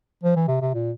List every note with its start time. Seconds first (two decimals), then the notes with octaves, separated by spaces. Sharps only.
0.23 F3
0.36 E3
0.48 C3
0.61 C3
0.74 A#2